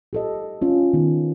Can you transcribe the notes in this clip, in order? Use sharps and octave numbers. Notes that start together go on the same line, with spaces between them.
G4 A4 D#5
C#4 F4
D#3 B3